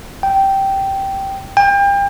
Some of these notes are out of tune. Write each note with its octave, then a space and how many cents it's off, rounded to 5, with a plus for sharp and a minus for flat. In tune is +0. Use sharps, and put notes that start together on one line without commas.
G5 -10
G5 +35